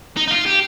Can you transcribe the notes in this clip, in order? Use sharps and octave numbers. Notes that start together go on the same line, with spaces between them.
D#4
D#4
F4
G4